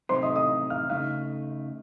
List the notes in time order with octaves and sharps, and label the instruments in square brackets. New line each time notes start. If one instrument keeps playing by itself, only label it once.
[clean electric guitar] C3 F#3 A3 D#4 [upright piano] C5 C6
[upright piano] D#5 D#6
D#5 D#6
F5 F6
[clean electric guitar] C#3 A3 D#4 [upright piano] F5 F6